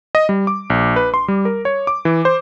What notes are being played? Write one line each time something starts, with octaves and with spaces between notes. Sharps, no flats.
D#5
G3
D6
A#1
B4
C6
G3
A#4
C#5
D6
E3
C5